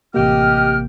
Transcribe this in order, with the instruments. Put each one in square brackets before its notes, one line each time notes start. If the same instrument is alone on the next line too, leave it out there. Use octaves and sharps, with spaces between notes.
[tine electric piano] A1 C3 A#3 [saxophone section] G4 [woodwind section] D#5 G5 F6